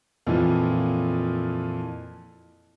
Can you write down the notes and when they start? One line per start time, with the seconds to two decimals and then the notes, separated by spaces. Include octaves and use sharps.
0.27 F2 A#2 E3 F3